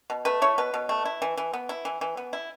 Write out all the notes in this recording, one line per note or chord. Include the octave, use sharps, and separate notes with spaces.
B2
A3 B4
E4 C#5
B2 B4
B2
A3
E4
E3
E3
B3
E4
E3
E3
B3
E4